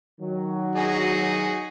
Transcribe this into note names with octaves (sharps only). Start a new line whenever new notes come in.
D#3 F#3
D#4 F#4 G#4